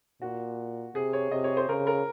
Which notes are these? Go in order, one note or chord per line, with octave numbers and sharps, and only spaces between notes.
A#2 F#4
C3 G#4
C#5
C3 D#5
C#5
C5
C#3 A#4
A#4